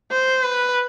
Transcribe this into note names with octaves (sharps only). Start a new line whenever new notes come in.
C5
B4